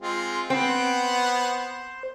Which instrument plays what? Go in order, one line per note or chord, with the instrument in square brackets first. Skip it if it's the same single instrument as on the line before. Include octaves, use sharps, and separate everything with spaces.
[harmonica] G#3 C4 F4
[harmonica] B3 F#5 [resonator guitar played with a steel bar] C4 [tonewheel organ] C5